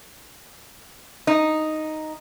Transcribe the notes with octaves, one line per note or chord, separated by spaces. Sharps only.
D#4